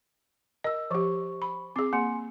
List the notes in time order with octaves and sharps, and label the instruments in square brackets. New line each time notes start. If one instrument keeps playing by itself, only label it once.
[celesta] A#4 E6 [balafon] D#5
[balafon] F3 G4 [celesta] C5 C#6
[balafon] B5
[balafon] C4 G#4 [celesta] D6 C7
[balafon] A#3 [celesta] G#5 C6 C#7